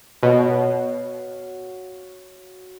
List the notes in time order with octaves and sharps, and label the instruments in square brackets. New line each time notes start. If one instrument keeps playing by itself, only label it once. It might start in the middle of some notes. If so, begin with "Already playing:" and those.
[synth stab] B2 [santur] F#4 C#5 F5